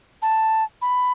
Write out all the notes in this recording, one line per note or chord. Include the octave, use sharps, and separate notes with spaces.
A5
B5